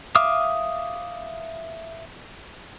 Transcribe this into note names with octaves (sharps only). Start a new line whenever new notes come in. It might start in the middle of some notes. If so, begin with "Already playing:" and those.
E5 F5 D6 D#6 F6